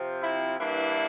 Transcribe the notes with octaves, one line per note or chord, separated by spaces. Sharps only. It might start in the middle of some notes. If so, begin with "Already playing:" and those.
Already playing: C3 F3 C4
E4
G2 E3 A#3 D4 E4